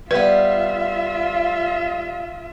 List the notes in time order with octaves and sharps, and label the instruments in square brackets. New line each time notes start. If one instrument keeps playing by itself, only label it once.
[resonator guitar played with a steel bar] G3 B3 [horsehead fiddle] F4 E5 [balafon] B4 [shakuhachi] F5